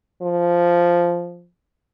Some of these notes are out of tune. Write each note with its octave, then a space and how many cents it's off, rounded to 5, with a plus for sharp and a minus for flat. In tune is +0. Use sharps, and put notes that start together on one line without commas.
F3 -5